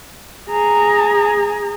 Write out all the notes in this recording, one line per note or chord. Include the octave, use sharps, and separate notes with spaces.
G#4 A#5